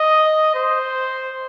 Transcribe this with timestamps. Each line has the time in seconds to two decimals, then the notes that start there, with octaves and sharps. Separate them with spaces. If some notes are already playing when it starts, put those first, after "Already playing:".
Already playing: D#5
0.54 C5